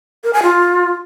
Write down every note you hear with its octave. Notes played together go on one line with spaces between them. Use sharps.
A#4
G#5
F4